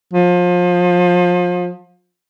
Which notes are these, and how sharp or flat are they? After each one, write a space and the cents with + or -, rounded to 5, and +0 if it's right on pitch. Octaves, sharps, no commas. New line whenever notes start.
F3 +30